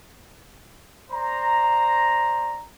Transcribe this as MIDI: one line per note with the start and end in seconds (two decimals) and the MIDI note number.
1.11 2.62 72
1.11 2.62 74
1.11 2.62 82